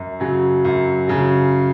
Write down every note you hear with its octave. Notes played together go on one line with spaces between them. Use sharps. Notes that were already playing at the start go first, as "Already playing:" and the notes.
Already playing: F#2
C#3 F#3
F#2
C#3 F#3